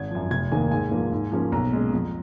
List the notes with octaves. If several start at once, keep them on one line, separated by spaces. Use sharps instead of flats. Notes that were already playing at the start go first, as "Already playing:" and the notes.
Already playing: G#1 G#6
F#2 F3
F1 G#6
D#2 D#3 A#3 G#5
G#2 G#5
F3 A#3
G#2
F3 A#3 C#4
B1 A#5
A#2 G#3 C#4
F2